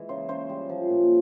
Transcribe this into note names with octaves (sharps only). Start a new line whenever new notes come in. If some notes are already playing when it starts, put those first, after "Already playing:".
Already playing: E3 G#3
C#3 C5
C#3 C5
G3
F3
A#2